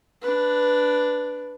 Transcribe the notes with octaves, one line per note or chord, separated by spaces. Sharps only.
D4 B4